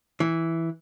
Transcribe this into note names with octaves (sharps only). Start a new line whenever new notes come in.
E3